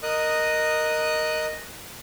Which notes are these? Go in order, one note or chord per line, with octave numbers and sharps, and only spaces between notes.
A#4 D#5 D#6 F#6